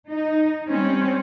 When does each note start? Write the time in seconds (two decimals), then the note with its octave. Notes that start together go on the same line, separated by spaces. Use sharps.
0.12 D#4
0.68 G3 C4 C#4